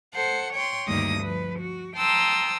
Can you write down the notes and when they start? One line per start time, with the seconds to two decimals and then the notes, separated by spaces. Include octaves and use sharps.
0.15 A4 C5 F#5
0.53 C#5 G5 C6
0.87 D2 G2 D#3 A#3 D#6 A#6
1.23 F3 B4
1.59 F#4
1.96 G5 A5 A#5 C6 D#6 E6